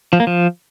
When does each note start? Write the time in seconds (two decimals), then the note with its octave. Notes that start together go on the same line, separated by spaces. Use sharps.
0.13 F3
0.20 A#3
0.27 F3